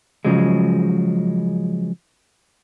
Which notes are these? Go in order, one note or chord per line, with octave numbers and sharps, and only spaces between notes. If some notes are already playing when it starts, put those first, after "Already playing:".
C#3 F3 F#3 G#3